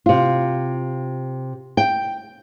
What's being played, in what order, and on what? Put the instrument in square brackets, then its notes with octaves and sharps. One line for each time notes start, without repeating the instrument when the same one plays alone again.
[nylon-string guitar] C3 F4
G5